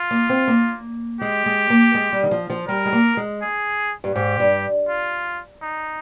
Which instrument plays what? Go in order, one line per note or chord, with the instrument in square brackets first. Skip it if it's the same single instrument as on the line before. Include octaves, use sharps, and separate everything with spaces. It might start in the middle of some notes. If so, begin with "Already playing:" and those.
Already playing: [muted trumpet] F4
[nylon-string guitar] A#3
C4
A#3
[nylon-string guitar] G#3 [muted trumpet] G4
[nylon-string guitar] G#3
A#3
G#3
G3
D#3
F3
F3
[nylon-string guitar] G3 [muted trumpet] A#4
[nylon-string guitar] G#3
A#3
G#3
[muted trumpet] G#4
[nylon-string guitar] G2
[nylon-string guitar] G#2 [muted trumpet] G4
[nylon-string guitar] G2
[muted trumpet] F4
D#4